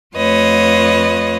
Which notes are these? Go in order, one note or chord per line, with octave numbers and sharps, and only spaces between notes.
F2 A3 F4 B4 C#5 D#5